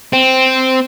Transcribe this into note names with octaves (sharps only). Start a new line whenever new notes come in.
C4